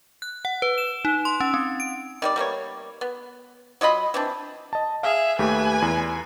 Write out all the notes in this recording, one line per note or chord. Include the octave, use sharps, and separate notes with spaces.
F#6
F#5
B4
E7
D#4
C6
C#4
C4
D7
D#3 G3 D5
G3 A#3 B3 C#5
B3
F#3 F4 D#5 B5
E3 C4 D4
D#5 A5
G#4 E5 F5
D#2 A3 G4 B4 G#5
E2